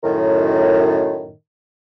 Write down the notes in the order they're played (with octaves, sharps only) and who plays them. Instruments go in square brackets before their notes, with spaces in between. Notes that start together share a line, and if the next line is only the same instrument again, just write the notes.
[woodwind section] F#2 A2 D#3